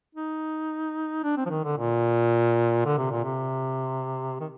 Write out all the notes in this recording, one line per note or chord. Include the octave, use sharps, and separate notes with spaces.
D#4
D4
C4
F3
D#3
D3
A#2
D3
C3
A#2
C3
D#3